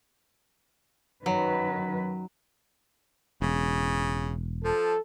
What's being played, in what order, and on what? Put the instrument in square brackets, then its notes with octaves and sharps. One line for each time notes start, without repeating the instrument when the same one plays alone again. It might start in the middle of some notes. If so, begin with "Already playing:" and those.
[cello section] F#2 D#3 B4 [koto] F#3
[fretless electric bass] E1 [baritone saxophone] C#3
[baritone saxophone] F3 [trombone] A4